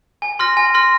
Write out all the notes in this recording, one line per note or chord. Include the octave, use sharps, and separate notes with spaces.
G#5
C6 F6 A#6
G#5
C6 F6 A#6